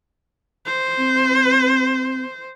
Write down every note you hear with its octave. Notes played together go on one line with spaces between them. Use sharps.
C5
C4